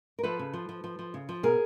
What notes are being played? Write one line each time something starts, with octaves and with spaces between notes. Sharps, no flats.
A#4
F3 A4 B4
C#3
F3
F3
F3
F3
C#3
F3
B2 G#4 A#4